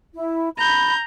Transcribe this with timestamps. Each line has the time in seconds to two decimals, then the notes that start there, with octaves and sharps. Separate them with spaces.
0.14 E4
0.58 A#5 B5 G6